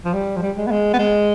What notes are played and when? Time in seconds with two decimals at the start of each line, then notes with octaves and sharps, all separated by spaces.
0.05 F3
0.14 G3
0.36 F3
0.42 G3
0.57 G#3
0.67 B3
0.71 G#3
0.94 B3
0.99 G#3